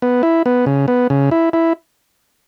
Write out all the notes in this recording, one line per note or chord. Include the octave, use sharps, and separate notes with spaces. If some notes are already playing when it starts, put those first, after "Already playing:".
B3
E4
B3
C#3
B3
C#3
E4
E4